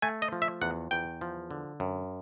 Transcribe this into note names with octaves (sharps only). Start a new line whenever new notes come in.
A3 G#5
D#5
F3
E5
E2 F#5
E2 G5
F3
D3
F#2